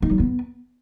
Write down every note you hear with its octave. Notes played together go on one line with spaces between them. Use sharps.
D#4
F#3
B3